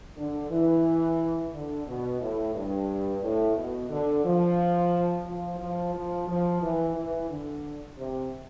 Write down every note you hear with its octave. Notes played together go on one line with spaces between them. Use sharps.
D3
E3
D3
B2
A2
G2
A2
B2
D3
F3
F3
F3
F3
F3
E3
E3
D3
C3